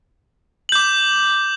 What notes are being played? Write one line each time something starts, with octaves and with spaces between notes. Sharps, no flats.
D6 G6 F#7